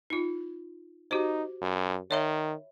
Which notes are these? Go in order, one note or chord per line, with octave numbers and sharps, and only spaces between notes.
D#4 F4
D#4 F#4 G4 C5
F#2
D#3 C#5 E5 B5